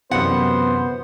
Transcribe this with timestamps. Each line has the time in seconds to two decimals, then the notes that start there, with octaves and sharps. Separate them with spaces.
0.11 F#2 C3 E3 B3 C5 F#5